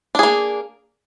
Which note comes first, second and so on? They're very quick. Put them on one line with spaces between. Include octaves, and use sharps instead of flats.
D4 G#4 A#3